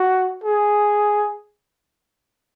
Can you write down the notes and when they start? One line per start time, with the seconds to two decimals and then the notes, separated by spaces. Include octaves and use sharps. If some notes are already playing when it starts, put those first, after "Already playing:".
Already playing: F#4
0.44 G#4